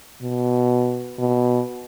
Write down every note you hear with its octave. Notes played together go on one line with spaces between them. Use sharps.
B2
B2